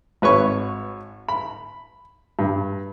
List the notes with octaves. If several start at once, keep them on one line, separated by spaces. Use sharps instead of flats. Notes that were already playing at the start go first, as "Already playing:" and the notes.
G#1 B4 C#5 C#6
B5
G2